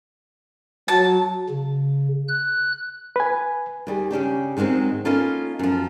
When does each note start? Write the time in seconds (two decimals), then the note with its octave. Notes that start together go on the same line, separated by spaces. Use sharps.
0.88 F#3 A5
1.49 C#3
2.28 F#6
3.16 B4 G#5
3.87 D#2 G3 G#4
4.11 C#3 C#4 D4 G4
4.57 G#2 D#3 F#3 G#3 C4
5.05 A#3 B3 C#4 D#4 F4 A4
5.59 F#2 F3